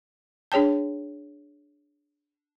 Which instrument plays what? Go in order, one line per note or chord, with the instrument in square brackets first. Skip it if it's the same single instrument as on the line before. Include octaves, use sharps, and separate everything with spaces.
[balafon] D4 G#4 C#5 G5 A5